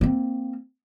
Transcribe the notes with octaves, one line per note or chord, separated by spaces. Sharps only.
A#3 C4